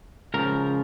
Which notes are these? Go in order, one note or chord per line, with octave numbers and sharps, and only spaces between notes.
C#2 C#3 F3 A#4